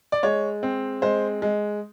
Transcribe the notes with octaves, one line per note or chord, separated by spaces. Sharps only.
D5
G#3 C#5
C4
G#3 C5
G#3